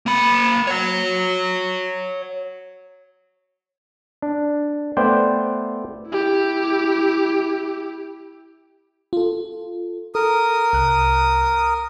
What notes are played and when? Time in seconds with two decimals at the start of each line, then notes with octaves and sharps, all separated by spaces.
0.06 A#3 B5
0.67 C#5 F#5
4.22 D4
4.97 A3 B3 C5 D5 G5
6.08 E4 G4
9.13 F4 A4
10.15 A4 A#4 D#6
10.73 C2 F#6